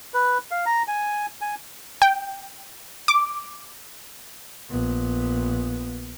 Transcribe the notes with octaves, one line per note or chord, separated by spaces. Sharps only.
B4
F5
A#5
G#5
G#5
G5
D6
A#1 B3